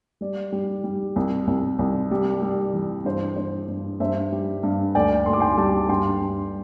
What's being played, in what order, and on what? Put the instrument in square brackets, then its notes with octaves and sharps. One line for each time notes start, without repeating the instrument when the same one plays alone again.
[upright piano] G3 D5
G3
G3
C2
C2
C2
G3
G3
E3
G2 C5
G2 C5
G2
G2 C5 E5
G3
G2
D2 D5 G5
D2 C6
D6
G5 C6
G3 A5 D6
G2 G5 C6
G2